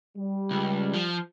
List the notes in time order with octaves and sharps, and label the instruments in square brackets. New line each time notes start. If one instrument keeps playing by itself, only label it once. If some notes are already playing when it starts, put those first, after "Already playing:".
[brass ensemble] G3
[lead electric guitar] C#2
F3